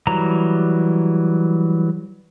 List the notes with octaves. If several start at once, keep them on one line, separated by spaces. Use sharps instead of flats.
E3 F#3 G3 A#5